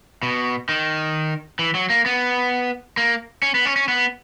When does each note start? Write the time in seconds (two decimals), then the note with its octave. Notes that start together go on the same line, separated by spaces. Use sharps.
0.23 B2
0.69 D#3
1.59 E3
1.74 F#3
1.90 A#3
2.06 B3
2.97 A#3
3.43 C#4
3.54 B3
3.65 C#4
3.76 C#4
3.88 B3